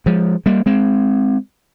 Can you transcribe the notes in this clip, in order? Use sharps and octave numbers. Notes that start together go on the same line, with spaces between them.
F3 G#3
G3 A#3
G#3 C4